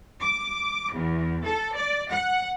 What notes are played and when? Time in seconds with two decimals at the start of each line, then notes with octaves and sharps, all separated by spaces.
0.22 D6
0.93 E2
1.45 A4
1.76 D5
2.11 F#5